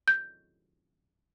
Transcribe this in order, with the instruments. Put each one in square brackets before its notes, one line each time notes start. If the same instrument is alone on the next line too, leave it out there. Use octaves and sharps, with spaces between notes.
[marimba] G6